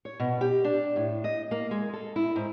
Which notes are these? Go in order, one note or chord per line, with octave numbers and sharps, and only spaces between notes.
C#5
B2
G4
D4
A2
D#5
A#3
G#3
A4
E4
G#2